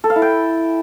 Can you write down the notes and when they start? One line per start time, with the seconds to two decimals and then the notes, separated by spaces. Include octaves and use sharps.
0.04 A4
0.10 F5
0.16 E4
0.22 G5